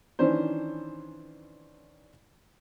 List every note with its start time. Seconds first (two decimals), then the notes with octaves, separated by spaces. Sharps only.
0.19 D#3 E3 C#4 D4 C5